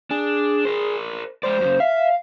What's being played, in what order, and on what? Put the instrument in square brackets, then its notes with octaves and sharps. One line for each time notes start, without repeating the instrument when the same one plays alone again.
[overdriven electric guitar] D4 [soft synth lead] G#4
[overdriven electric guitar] A#4 C5
[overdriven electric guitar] G#3 D5 [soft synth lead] C5
[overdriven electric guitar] F#2 C#3
[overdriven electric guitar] E5 [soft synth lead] F5